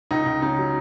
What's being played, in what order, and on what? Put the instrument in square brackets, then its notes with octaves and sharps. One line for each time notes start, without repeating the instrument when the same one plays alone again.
[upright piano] C#2 D#4
C#2
C#3 D#4
F#3